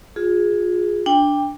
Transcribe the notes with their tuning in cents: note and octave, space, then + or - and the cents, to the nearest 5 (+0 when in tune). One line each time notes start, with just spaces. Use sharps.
F4 +30 G#4 +0
D4 +0 G5 +20